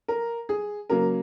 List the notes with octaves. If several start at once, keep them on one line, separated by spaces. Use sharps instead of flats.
A#4
G#4
C#3 F#3 A#3 A#4